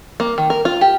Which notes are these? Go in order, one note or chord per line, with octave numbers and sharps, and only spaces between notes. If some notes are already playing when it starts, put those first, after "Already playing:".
A#3
D#3
A#4
F4
G4